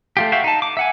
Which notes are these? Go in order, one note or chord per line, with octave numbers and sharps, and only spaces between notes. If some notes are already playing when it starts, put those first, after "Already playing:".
A3 F4 G4
F#4 E5 F5 G5
D#4 A5
D6
E5 F#5 G#5